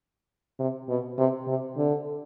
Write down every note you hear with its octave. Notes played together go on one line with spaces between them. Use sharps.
C3
B2
C3
C3
D3